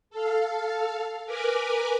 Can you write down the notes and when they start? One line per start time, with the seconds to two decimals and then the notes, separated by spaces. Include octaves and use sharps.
0.10 A4 F5
1.26 A#4 B4 G#5 D6